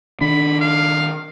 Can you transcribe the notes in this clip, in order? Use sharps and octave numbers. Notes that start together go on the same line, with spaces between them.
D#3 D4 B5
F5